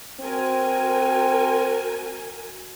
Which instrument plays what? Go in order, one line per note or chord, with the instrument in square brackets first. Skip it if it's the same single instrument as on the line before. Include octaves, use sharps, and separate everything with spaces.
[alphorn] C4 [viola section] F#4 A#4 G#5